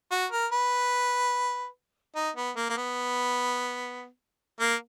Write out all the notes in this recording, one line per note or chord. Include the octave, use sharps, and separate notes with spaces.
F#4
A#4
B4
D#4
B3
A#3
A#3
B3
A#3